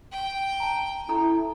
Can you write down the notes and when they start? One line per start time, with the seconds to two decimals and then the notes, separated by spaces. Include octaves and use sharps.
0.12 G5
0.60 A5 A#5
1.09 D#4 E4 A4 A#5